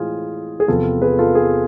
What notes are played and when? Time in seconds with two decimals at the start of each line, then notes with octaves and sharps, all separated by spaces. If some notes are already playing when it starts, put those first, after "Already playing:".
Already playing: A2 E3 G#3 C4 F4 G#4
0.60 G#4
0.68 E2 C3 F3 B3 F4 A4
1.02 G#4 B4
1.18 F4 A4
1.35 G#4